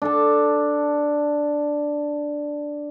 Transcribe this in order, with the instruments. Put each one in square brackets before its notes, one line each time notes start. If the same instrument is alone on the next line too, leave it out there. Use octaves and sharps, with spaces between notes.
[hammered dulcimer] D4 A4 A5